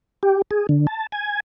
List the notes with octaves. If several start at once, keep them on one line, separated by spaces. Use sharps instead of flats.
G4
G#4
D3
A5
G#5